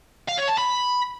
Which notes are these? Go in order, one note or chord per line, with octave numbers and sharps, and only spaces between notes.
F5
C#5
A5
B5